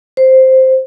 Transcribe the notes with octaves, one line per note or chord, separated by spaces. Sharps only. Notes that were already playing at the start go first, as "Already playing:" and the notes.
C5